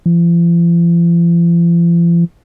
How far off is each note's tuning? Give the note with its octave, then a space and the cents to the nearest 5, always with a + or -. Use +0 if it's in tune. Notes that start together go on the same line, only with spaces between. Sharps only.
F3 -45